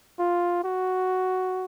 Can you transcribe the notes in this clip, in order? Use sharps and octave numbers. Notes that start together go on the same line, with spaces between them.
F4
F#4